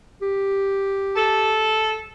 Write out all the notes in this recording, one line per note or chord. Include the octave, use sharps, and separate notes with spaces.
G4
A4